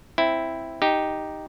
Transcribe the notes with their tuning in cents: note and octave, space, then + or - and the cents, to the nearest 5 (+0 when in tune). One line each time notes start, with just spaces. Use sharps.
C4 +0 E4 +0
D#4 +0 G4 +0